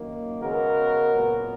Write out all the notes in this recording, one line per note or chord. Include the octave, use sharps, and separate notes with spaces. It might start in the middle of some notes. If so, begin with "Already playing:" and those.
Already playing: F#2 D#3 A#3
C#3 G#3 B3 F#4 A#4
A#2 F#3 B3